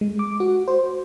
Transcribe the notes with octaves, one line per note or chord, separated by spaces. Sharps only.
G#3
D6
F#4
C5